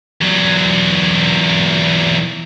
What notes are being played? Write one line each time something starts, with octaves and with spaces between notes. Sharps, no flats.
E2 F#3